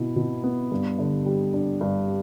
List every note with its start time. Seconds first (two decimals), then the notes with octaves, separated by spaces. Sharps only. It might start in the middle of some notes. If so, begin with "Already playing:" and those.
Already playing: B2 B3 E4
0.16 B2
0.44 B3
0.71 G2
0.98 D3
1.26 G3
1.54 D4
1.81 G2